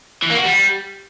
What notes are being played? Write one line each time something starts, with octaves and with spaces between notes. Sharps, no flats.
E3
A#3
F#4
G3